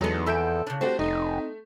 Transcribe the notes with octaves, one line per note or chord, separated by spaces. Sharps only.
E2 F#3 G#3 B3 D#4 A4
F2 E3 A4 E5 E6 G6 D7
C#3 D4
A3 C4 D4 F#4 G4 C5
F1 A3 D#4